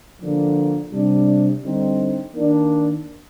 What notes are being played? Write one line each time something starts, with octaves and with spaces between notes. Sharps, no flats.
D3 F3 A#3 D4
C3 G3 D4
D3 G3 C4 D#4
D#3 A#3 D4